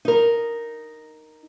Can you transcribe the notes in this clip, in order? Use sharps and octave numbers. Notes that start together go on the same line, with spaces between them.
D#4 A#4